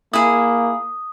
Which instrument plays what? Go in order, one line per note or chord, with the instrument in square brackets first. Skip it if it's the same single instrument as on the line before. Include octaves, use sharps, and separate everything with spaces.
[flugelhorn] A#3 [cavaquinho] E4 G#4 [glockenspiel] D#6